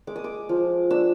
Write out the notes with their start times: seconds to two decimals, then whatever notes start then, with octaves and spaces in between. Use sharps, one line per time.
0.07 G#3 D6
0.16 D#6
0.24 D6
0.49 F3
0.91 D4 E6